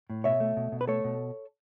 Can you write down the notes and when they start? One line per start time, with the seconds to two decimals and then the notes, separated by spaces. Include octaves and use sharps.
0.10 A2
0.24 B2 C#5 E5
0.40 A3
0.57 B2
0.72 B2
0.81 B4
0.87 A3 A4 C#5
1.05 B2